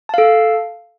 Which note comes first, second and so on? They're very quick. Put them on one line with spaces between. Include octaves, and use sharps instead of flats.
A5 F5 A4